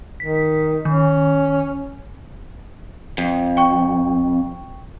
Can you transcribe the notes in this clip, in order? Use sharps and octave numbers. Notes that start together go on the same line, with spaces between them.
D#3 B6
D#3 C#4
F2
G5 C#6